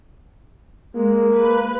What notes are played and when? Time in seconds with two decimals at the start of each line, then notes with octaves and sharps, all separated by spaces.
0.95 G#3 A#3
1.34 B4